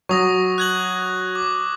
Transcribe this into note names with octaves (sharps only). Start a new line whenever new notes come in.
F#3 C#6 D#6 A#6
F#6 G#6 F#7
D6